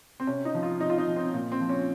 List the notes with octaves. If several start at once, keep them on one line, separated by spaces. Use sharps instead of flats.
C4
C3 C#4
D#4
F3
F4
C3 D#4
F4
D#4
F3
C4
A#2
C4
F3
C#4